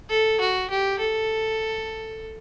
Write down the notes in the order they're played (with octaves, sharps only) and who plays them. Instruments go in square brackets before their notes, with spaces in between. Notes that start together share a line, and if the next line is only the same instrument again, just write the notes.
[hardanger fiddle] A4
F#4
G4
A4